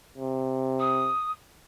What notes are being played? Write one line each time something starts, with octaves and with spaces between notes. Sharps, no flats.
C3
D#6